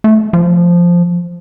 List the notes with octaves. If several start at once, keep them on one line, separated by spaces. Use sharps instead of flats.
A3
F3